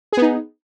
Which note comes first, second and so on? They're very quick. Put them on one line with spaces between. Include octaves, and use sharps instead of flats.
G#4 B3 D#4